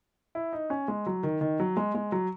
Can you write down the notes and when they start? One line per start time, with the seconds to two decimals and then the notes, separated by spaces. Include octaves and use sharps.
0.35 E4
0.53 D#4
0.70 C#4
0.88 G#3
1.06 F#3
1.23 D#3
1.41 D#3
1.60 F#3
1.77 G#3
1.95 G#3
2.12 F#3